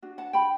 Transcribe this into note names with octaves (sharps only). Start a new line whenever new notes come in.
D4 F#4
F#5 A5
G5 B5